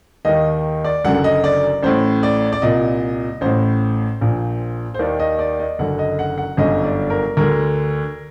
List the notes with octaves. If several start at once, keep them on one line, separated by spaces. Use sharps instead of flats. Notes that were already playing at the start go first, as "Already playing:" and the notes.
D#2 D#3 D#5
D5
F#1 F#2 D3 F#5
F#5
D#5
D5
A1 A2 C5
D5
D5
C2 A#2 D#5
A1 A2 C5
A#1 A#2
C5
D#2 D#3 D5
D#5
D5
D#5
F#1 F#2 D3 F#5
D#5
F#5
F#5
G1 F#2 D3 D#5
D5
A#4
D2 D3 A#4